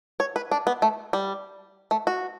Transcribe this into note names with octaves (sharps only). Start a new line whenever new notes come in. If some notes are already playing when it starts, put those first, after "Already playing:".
C#5
B4
D4
B3
A3
G3
A3
F#4